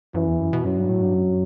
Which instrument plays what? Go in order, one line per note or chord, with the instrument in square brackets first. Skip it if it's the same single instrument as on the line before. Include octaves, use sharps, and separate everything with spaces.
[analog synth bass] F#2 [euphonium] E3
[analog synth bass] E2
F#2
B2
[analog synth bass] F#2 [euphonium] F#3
[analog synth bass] G2
A2
G2
F#2